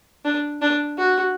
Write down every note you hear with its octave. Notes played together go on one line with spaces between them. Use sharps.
D4
D4
F#4